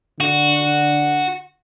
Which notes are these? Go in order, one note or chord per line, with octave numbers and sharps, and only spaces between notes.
D3 F#4